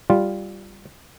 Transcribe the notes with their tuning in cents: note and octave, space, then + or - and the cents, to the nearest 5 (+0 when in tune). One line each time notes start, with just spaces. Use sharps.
G3 +0 F4 +0